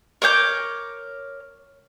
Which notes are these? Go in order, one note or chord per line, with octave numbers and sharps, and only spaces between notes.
A#4 C#5 D6 G6